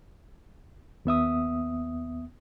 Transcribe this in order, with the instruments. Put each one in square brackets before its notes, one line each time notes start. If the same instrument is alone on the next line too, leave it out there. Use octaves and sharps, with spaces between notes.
[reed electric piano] D#2 B3 E5 D#6